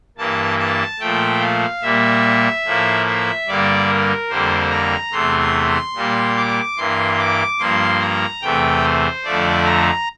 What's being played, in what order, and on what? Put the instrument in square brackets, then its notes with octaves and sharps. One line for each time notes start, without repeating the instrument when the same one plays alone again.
[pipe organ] G2 E3 A#3 A5
A5
A#2 F3 A3 G5
F5
A#2 G3 A#3 E5
A2 F3 A#3
E5
G2 D3 G3 A#3 D5
A#4
F2 D3 G3 A#3 C5
A#5
E2 C3 E3 A3 C6
A#2 G3 A#3
D6
G2 E3 A#3 C6
D6
G2 F3 A#3 C6
A#5
E2 C3 E3 A3 G5
C5
F2 D3 F3 A3 D5
A#5